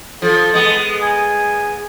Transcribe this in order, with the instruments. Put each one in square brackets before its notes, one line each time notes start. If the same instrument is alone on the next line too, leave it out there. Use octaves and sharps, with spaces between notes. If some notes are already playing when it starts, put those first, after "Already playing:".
[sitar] F3 [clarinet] A4
[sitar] G#3 B3
[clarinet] G#5